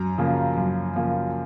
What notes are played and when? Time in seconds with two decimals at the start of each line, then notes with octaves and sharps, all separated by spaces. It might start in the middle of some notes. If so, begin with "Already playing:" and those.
Already playing: F#2 A#5
0.18 C#3 F3 A#3
0.57 F#2
0.96 C#3 F3 A#3